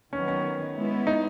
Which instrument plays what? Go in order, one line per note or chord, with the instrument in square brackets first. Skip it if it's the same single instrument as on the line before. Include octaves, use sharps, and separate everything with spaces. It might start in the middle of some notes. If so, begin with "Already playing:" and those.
[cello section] D#3 F#3 B3 [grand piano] C#4
[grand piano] C#4
[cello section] G#3 B3 E4
[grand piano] D#4